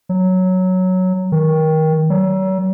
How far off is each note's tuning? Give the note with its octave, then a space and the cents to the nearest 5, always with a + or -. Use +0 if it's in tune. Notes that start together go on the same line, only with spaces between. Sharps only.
F#3 +0
D#3 +20
F#3 +40